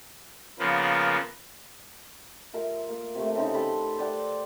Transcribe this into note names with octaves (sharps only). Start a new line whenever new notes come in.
C#3 F3 A#3 B3
F4 A#4 E5
A#3
C3 A3
C#3 C4 D#4
A4 B5 C6
C5 D5 F#5 G5